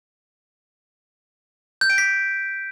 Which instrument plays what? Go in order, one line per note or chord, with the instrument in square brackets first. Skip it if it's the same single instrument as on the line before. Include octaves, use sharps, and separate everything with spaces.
[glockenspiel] G6
D7
B6